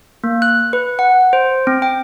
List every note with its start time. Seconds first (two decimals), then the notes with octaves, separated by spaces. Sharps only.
0.24 A#3
0.42 F#6
0.73 B4
0.99 F#5
1.33 C5
1.67 C4
1.82 G5